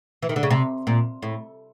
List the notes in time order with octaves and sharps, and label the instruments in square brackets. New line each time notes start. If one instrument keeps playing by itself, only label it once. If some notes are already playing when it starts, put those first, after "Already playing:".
[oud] E3
D#3
D3
C#3
C3
A#2
A2